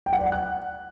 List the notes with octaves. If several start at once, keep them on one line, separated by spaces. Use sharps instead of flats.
G5
F#5
D5
F#5
F#6